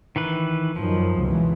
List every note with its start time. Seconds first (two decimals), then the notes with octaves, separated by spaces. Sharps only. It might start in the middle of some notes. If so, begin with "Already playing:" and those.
0.16 D#3 E3 B4
0.76 F#2 D#3 F3 F#3
1.20 C#2 B2 E3